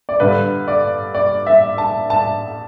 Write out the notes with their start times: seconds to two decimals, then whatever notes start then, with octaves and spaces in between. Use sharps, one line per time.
0.09 D5
0.20 G1 G2 D3 B4
0.68 D5
1.15 D5
1.47 E5
1.78 A5
2.10 A5